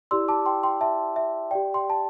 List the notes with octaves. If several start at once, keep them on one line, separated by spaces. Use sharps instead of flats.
E4 G4 D5 C6 E6
A5 D6
G5 C6
G5 C6
E5 A5
E5
G4 D5 G5
G5 C6
A5